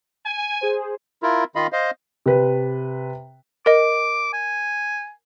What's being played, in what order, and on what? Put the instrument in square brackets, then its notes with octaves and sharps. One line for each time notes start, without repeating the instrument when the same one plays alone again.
[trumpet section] G#5
[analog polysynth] G#4 C5
[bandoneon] E4 F4 A#4
D#3 F4 D#5 F5 B5
C5 D#5 F5
[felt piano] C3 B4
[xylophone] A#4 D#5 [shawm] D6
[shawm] G#5